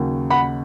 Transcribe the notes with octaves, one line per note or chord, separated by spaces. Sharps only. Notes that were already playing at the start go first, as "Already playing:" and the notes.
Already playing: D#2 C#3 F#3
F#5 B5